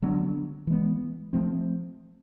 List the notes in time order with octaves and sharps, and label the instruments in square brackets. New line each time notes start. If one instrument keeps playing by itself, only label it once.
[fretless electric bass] D3 F#3 B3 D4
E3 G#3 B3
F3 A3 C4